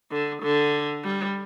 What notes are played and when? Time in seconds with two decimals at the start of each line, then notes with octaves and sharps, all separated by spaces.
0.11 D3
0.42 D3
1.03 G3